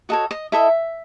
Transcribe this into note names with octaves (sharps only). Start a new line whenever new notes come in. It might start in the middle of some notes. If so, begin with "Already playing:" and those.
F#4 A4 C#5 D#5
D#5
E4 A4 D#5 E5